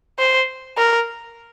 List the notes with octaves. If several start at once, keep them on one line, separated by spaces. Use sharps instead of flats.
C5
A#4